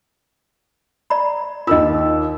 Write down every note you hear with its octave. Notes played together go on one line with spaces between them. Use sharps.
D5 A#5 B5
D#2 F4 A#4 D#5 E6